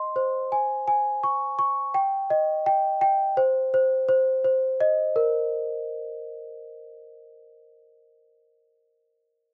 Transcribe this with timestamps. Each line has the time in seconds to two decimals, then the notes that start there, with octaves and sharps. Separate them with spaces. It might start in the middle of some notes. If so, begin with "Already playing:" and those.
Already playing: D#5 C6
0.16 C5
0.52 G#5
0.88 G#5
1.23 C#6
1.59 C#6
1.94 G5
2.30 D#5
2.66 G5
3.01 G5
3.37 C5
3.74 C5
4.09 C5
4.45 C5
4.80 D#5
5.16 A#4